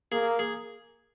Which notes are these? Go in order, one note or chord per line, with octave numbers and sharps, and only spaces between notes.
A#3 G#4
G#4